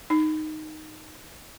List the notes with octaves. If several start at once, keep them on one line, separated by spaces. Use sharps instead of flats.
D#4